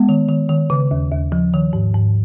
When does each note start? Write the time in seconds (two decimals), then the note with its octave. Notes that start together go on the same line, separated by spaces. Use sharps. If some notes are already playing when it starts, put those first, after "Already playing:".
Already playing: G#3 B3
0.09 D#3
0.28 D#3
0.49 D#3
0.70 C#3
0.91 D#2
1.11 D#2
1.32 F3
1.53 D#3
1.73 G#2
1.94 G#2